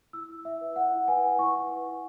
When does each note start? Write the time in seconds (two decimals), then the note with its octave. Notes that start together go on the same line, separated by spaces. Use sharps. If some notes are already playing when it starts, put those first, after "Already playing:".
0.13 E4 E6
0.29 E4
0.45 E4 E5
0.61 B4
0.76 E4 F#5
0.92 E4
1.08 B4 G#5
1.24 B4
1.39 E4 C#6
1.54 E4
1.70 B4
1.86 E4